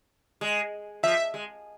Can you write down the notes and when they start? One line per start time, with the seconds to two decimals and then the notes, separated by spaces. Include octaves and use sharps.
0.41 G#3
1.03 F3 E5
1.34 G#3